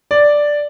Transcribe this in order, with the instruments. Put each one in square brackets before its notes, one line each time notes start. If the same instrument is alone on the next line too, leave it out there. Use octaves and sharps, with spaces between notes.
[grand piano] D5